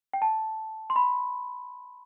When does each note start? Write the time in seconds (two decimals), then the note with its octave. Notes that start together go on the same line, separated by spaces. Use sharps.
0.13 G5
0.22 A5
0.90 C6
0.96 B5